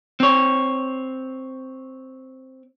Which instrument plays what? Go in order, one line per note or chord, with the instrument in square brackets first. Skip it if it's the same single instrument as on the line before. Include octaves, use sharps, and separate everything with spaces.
[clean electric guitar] C4 C#5